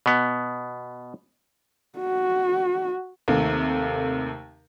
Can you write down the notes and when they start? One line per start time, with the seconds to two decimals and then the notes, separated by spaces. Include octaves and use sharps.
0.06 B2 B3
1.99 F#4
3.28 D#2 C3 A3